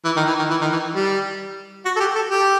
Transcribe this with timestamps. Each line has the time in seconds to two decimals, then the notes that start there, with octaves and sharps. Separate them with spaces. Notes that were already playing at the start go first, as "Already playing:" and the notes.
0.05 E3
0.17 D#3
0.28 E3
0.39 D#3
0.50 E3
0.61 D#3
0.72 E3
0.95 G3
1.85 F#4
1.96 A4
2.00 G4
2.16 A4
2.31 G4